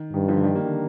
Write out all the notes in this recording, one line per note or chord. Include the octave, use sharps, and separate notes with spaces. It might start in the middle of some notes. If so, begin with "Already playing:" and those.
Already playing: D#3
G2 D#3
D3 F3
D#3 G3
G3 A#3
D3